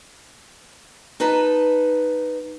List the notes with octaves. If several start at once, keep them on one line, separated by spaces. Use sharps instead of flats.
D#4 B4 A5